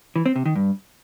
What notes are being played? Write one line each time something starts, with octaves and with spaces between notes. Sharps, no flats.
E3
C4
C3
D#3
G2